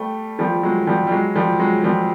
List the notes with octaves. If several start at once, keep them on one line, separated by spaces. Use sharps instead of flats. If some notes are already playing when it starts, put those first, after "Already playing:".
Already playing: G3 A3
F3 G3
F#3 G#3
F3 G3
G3
F#3 G#3
F3 G3
F#3 G#3
F3 G3